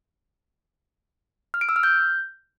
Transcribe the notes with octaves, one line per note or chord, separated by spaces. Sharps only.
F6
D7
E6
F6
G6